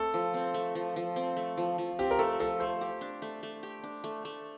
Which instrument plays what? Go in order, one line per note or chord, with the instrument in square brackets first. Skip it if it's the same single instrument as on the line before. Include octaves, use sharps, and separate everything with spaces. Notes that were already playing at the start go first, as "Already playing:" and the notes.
Already playing: [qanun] A3 C4 [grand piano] A4
[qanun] F3
C4
A3
F3
F3
C4
A3
F3
F3
[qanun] C4 [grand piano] G4
[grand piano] A#4
[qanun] A3 [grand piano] A4
[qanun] F3 [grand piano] A4
[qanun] A3 [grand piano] C5
[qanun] G4
D4
A3
A3
G4
D4
A3
A3